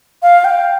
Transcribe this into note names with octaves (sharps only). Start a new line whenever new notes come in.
F5
G5